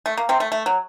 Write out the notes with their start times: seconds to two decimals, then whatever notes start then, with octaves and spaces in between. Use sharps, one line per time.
0.06 A3
0.17 A#3
0.29 C3 C4
0.40 A3
0.52 A3
0.66 F#3